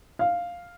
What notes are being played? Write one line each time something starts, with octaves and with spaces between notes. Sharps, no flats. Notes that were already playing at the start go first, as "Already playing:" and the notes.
F5